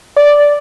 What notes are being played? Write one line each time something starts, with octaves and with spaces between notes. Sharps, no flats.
D5